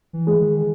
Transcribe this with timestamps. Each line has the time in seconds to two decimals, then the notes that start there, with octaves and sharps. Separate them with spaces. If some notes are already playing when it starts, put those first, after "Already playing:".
0.13 E3
0.27 G#3
0.40 D#3